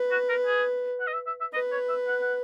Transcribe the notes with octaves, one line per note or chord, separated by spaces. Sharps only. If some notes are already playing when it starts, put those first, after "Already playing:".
Already playing: B4
F#4
A#4
G#4
F#5
D#5
E5
E5
E5
B4 D#5
C#5
E5
F#5
F#5